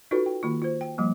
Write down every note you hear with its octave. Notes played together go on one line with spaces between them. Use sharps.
D#4 F4 F#4 A4 B4 C#5
G5
D#3 A#3 F4
F4 C5
G5
F3 G3 A#3